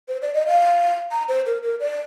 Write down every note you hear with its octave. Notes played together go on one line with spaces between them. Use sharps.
C5
D5
D#5
F5
A#5
C5
A#4
A#4
D5